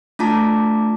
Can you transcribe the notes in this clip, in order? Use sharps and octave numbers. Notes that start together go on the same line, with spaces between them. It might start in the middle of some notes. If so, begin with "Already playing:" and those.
A3 D4 F4 A5 A#5 D6